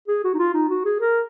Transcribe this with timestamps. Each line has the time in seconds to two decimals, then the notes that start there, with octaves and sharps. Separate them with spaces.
0.08 G#4
0.24 F#4
0.34 D#4
0.39 F4
0.54 D#4
0.69 F#4
0.85 G#4
1.01 A#4